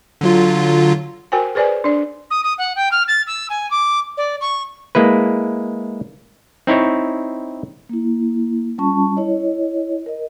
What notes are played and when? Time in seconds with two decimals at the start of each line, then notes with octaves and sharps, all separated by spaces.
0.21 D3 F#3 F4
1.32 F#4 A#4 C5 G5 G#5
1.55 G#4 B4 C5 D5 G#5
1.84 D4 D5
2.30 D#6
2.43 D#6
2.58 F#5
2.75 G5
2.91 F6
3.07 A6
3.27 E6
3.50 G#5
3.70 D6
4.17 D5
4.41 C#6
4.95 G#3 A#3 E4 B4
6.67 C4 D#4 E4 C#5
7.89 A#3 E4
8.78 G3 C#4 F4 A5 C#6
9.17 E4 C#5 D#5
10.06 A#4 D#5